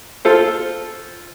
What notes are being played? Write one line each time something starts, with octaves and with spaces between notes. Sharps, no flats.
F4 A4 C5